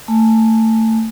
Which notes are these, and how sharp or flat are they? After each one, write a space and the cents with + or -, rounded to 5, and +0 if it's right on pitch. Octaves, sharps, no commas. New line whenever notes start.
A3 +25 G#5 +20